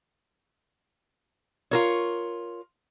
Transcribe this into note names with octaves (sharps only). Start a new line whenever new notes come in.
F4 A#4 C#5